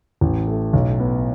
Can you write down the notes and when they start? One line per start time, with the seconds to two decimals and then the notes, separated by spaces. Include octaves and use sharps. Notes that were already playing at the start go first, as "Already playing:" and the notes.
0.21 A1
0.47 A3
0.73 B1
1.00 B3